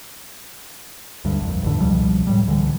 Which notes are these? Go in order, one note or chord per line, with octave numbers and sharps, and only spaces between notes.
D2 G2
A#1 F2
A1 E2 D3
C#2 B2 F3 G3
A2 G3
C#2 D3 E3